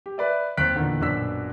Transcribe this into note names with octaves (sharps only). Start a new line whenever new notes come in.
G4
B4 D5 E5
D#2 C4 F#6 B6 D7
E2 A#2 D3 D#3
A#1 F#2 B2 D4 E6 B6